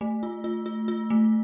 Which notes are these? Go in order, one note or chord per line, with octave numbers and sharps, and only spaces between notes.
A3
F4
F4
F4
F4
A3